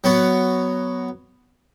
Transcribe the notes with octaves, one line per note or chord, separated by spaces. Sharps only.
F#3 B3 F#4